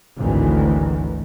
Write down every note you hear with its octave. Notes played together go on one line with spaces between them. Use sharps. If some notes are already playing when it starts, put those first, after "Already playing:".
G#1 D2 A2 D#3 E3